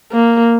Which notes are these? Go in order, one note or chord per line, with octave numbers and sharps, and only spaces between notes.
A#3